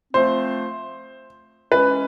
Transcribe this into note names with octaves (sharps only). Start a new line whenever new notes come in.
F3 A3 C4 C5
E3 G#3 C#4 B4